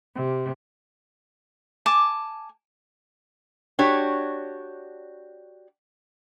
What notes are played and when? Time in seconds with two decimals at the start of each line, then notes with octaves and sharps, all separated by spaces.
0.14 C3
1.86 G#5 A5 D6
3.79 D4 F#4 G4 C#5